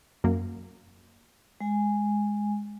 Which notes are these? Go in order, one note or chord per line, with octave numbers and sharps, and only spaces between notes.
F#2 A#3
G#3 G#5